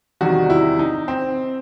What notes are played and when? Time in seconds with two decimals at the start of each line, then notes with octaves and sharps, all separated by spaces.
0.21 E2 C3 D#3 G3 F#4
0.50 E4
0.79 D#4
1.08 C4